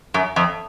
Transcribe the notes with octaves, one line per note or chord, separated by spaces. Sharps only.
F#2
F2